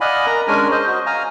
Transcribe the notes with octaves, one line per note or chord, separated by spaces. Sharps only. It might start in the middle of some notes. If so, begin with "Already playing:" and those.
D5 D#5 F5 F#5 G#5 B5
A#4 A#5
G#3 C#4 D4 A#4 G#5
C5 D#5
F#4 D#5
F5 G#5 A#5